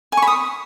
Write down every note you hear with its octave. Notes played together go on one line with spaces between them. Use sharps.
G#5
C#6
B5
D#6